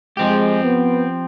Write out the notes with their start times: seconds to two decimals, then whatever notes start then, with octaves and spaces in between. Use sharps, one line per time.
0.17 F3 G#3 C4 G4
0.64 B3